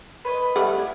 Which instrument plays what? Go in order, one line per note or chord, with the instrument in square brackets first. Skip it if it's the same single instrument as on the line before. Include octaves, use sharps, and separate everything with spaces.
[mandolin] B4 C#5 D#5
[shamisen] G3 A3 F#5
[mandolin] E4